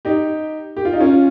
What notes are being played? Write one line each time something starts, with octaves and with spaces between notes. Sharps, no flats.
D#4 G4
G4
F4
D#4
C#4 F4